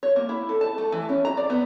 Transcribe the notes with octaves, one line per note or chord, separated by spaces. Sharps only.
C#5
A#3
E4
A4
A5
A3
E3
C#4
A#5
D5
B3